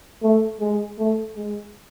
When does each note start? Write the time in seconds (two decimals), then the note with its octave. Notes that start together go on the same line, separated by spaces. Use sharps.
0.23 A3
0.60 G#3
0.99 A3
1.37 G#3